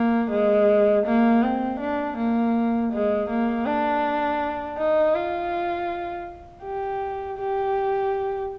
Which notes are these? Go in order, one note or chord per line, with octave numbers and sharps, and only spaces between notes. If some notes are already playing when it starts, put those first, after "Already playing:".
Already playing: A#3
G#3
A#3
C4
D4
A#3
G#3
A#3
D4
D#4
F4
G4
G4